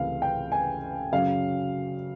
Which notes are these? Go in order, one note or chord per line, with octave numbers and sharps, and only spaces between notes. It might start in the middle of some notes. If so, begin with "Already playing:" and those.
Already playing: C#2 C3 E3 A3 F5
G5
G#5
F#2 C#3 F#3 F5